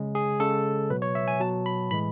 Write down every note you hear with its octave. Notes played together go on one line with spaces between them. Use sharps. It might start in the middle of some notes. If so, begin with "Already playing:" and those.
Already playing: C#3 G#3
G#4
C#3 G#3 A4
B2 F#3 B4
C#5
E5
G#5
B2 F#3 A5
B5
A2 E3 G#3 B5